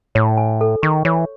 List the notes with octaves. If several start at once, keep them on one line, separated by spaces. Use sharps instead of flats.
A2 C#5
G#5
A4
D#3 C#6
E3 C#5